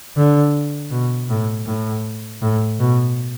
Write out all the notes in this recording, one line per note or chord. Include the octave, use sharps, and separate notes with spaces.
D3
B2
A2
A2
A2
B2